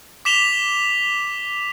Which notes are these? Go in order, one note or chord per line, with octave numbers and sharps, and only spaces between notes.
D6 B6 E7 F7 G7